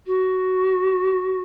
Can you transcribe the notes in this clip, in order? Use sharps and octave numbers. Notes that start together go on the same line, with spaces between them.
F#4